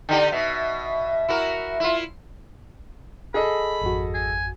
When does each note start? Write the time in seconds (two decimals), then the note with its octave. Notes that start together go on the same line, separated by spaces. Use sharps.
0.09 D3 D#4 G4 G5
0.32 B2 E5
1.29 E4 F#4 A#4
1.80 E4 F4
3.34 G#4 A4 D#5 B5
3.82 G#1 F2 F#4
4.14 G#5